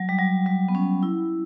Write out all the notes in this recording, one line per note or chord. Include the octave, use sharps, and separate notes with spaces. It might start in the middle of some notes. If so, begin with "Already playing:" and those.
Already playing: F#3
G3
F#3
G3
B3
C#4
E4